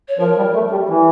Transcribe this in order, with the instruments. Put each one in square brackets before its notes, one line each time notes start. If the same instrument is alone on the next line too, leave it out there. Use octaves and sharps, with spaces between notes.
[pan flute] C#5
[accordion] F3 [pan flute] A#4
[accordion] G3
A3
G3
E3